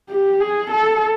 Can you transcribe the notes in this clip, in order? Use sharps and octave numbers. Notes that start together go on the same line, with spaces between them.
G4
G#4
A4